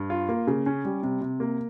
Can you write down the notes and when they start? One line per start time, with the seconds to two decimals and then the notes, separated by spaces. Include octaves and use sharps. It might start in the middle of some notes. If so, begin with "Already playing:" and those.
Already playing: G2
0.10 F4
0.29 A#3
0.47 C#3
0.66 C#4
0.85 G3
1.03 C3
1.21 C3
1.40 A#3